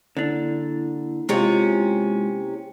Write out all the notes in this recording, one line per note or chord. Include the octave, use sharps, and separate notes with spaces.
D3 A#3 D4 E4
C3 G#3 C#4 F4